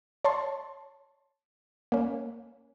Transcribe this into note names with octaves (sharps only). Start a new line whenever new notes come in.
C#5 A5 C6
A#3 C#4